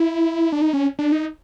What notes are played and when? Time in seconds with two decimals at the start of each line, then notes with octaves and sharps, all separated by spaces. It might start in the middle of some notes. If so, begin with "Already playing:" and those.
Already playing: E4
0.52 D4
0.62 D#4
0.73 C#4
0.99 D4
1.12 D#4